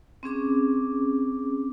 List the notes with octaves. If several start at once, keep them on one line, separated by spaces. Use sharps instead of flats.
C4 C#4 G#4 D6